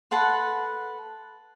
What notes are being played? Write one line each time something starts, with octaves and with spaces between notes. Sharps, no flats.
A4 B4 F#5 C6